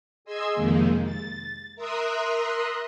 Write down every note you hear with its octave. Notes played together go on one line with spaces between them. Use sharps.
G#4 D#5 C6 E6 G#6
F2 C3 D#3 G#3 A#3
A6
A#4 E5 A#5 C6 D#6 F#6